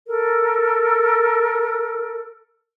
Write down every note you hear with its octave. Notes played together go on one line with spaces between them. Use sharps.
A4 A#4